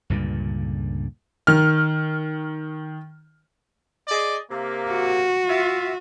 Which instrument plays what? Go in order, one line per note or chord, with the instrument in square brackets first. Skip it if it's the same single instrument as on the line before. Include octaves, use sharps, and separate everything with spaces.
[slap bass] C#2 G2 A#2 D3
[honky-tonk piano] D#3 F6
[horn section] G#4 D5 D#5
C3 A#3
[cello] F#4
[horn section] F4 E5